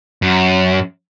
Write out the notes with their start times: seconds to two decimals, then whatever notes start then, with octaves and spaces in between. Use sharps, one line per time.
0.22 F#2